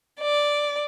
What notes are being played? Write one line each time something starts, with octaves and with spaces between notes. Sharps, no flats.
D5